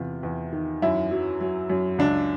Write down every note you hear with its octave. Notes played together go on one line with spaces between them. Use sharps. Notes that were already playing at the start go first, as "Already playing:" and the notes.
Already playing: E2 C3 F4
E2
D#3
F#2 E4
F#3
F#3
F#2
C#2 D4